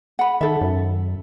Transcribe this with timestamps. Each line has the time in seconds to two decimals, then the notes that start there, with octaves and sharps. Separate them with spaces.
0.19 F#5 B5
0.41 D#3 A4 E5
0.61 F#2